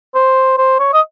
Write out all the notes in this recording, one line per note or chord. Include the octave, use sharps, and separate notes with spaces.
C5
C5
C#5
D#5